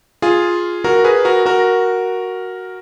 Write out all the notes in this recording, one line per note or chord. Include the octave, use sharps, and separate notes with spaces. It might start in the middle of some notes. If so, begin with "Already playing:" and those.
F4 G#4
F#4 A#4
G#4 B4
F#4 A#4
F#4 A#4